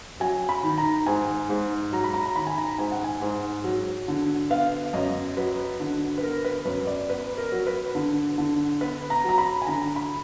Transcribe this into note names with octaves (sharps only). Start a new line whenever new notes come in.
F#3 G#5
B5
D#3
A#5
G#2 G#5
G#2
F#3 A#5
B5
A#5
A#5
D#3 B5
G#5
A#5
G#2 G#5
F#5
G#5
G#2
F#3
D3
B3 F5
F#2 D#5
F#3 B4
D3
B4
B3 A#4
B4
F#2 B4
D5
B3 B4
A#4
F#3
B4
D3
D3
B3 B4
A#5
F#3 A#5
B5
G#5
D3 A#5
B5